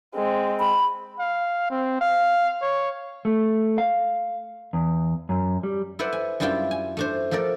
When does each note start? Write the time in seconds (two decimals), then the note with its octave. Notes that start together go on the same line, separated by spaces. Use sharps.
0.15 G#3 C4
0.60 B5
1.19 F5
1.70 C4
2.01 F5
2.62 C#5
3.25 A3
3.78 F5
4.73 E2
5.29 F#2
5.63 G3
5.99 E4 A4 B4 C5 D5 F#5
6.13 G#5
6.40 F#2 G3 D4 E4 F4 G5
6.71 G#5
6.97 A3 D4 C5
7.31 F3 A3 A4 A#4 D5